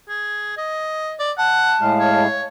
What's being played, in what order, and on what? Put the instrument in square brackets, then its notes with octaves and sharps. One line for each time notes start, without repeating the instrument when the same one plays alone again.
[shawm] G#4
D#5
D5
[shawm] F#5 [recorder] A5
[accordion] A2 G#3 F5
[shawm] C#5